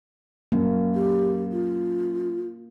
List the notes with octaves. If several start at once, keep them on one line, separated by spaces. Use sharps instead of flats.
F#2 A#3
G4
F4